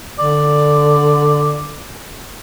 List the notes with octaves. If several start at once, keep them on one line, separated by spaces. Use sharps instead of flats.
D3 D5